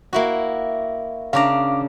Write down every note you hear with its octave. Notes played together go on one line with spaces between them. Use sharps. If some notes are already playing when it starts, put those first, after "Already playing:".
A#3 E4 F#4
C#3 D4 F5 A#5 D6